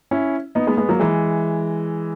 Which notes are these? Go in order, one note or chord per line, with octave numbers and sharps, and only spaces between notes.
C#4 E4
B3 D#4
G#3 B3
G#3 B3
F#3 A#3
E3 G#3